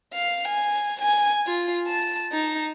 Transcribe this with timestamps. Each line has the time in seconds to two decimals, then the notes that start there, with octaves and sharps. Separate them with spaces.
0.14 F5
0.48 G#5
1.01 G#5
1.47 F4
1.88 A5
2.32 D#4